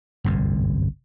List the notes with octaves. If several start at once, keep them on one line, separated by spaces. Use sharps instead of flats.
G1 C2 F#2 A2